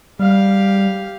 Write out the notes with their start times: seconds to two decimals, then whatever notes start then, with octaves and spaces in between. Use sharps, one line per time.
0.19 G3 G4 F5